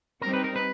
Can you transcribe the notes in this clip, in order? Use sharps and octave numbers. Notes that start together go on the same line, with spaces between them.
G3 C4 D#4 A#4
B4
A#4
B4